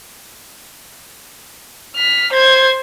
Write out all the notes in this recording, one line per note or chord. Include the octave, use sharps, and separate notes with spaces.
F6 B6
C5 G#6